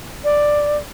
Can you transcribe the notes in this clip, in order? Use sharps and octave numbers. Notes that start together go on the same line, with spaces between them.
D5